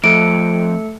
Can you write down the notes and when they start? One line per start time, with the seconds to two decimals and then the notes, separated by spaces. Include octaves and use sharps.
0.04 F2 A3 A4 C#7 D7